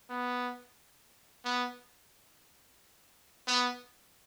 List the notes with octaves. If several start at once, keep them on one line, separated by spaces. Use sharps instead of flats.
B3
B3
B3